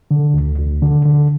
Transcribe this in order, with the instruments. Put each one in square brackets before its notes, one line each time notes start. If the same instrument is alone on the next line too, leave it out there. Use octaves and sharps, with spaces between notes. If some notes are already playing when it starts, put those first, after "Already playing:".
[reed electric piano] D3
D2
D2
D3
D3